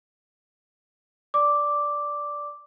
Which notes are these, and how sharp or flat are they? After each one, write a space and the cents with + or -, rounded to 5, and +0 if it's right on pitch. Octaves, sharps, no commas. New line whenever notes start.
D5 -5 D6 +0